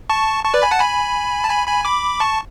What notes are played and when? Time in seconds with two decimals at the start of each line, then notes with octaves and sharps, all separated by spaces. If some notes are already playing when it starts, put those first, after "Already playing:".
0.10 A5 C#6
0.44 A5 C#6
0.54 B4 D5
0.62 G#5 B5
0.71 F#5 A5
0.79 G#5 B5
1.44 A5
1.50 G#5 B5
1.67 G#5 B5
1.85 B5 D6
2.20 A5 C#6